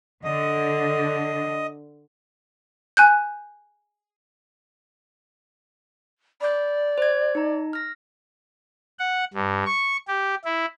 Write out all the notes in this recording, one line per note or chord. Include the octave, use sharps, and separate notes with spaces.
D3 D#5
G#5 F#6 G6
D5 B5 G6
C5 G#6
D#4 A#5
F6 A#6
F#5
G2
C#6
G4
E4